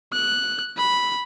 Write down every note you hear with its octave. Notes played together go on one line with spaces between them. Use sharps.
F#6
B5